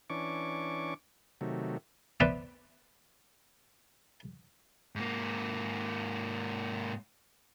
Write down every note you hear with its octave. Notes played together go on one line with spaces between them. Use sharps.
E3 C#4 D4 C#6 D6
C3 D#3 F#3 A3
B3 B4 C5 D5 E5 G5
G#2 A#3